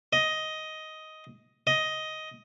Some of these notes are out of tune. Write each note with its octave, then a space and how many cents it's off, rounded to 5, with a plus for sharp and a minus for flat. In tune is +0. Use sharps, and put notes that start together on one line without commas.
D#5 +10
D#5 +10